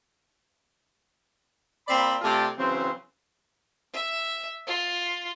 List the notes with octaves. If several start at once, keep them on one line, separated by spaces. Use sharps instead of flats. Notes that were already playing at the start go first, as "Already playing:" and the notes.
A#2 C4 D5 B5
C3 A3 F4 G4 D5 A5
C#3 E3 F#3 C4
E5
F4